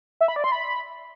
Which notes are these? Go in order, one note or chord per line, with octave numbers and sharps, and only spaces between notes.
E5
B5
D5
C6
B5